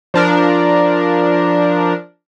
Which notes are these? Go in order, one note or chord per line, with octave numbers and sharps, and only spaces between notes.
F3 D4 A#4